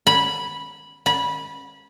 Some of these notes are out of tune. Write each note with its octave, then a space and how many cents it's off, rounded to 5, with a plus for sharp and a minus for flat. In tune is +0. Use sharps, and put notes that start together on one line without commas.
B5 -10
B5 -20